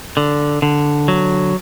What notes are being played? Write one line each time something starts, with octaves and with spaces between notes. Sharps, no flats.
D3
D3
F#3